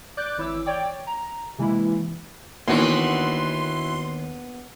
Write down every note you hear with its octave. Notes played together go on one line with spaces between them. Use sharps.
D5 D6 F#6 G6
G#1 E3 E4 C#5 D6 E6
C#5 D5 G5 D6
A#5
C3 E3 G#3 A#3 E4
D#2 E3 A#3 B3 D4 F#4 C6